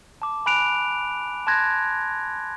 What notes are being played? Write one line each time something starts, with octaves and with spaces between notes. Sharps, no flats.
A5 D6
G#5 B5 F#6 D7 F7
A5 C6 F#6 G#6 A#6